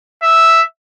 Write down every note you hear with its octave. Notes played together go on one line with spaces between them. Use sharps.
E5